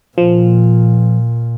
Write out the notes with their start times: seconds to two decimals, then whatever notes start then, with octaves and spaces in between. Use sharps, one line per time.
0.18 A#2 F3